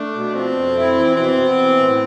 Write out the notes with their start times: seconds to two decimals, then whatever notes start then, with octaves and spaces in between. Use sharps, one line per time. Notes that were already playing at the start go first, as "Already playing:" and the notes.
Already playing: A3 D4
0.14 B2
0.35 F3 C4
0.55 F2
0.76 E4
0.96 E3
1.16 B2 C4
1.37 B3
1.58 E3
1.78 A2